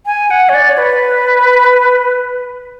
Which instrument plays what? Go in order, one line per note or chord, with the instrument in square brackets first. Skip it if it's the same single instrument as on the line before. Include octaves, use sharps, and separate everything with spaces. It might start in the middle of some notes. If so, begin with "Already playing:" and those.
[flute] G#5
F#5
C#5
D5
C#5
B4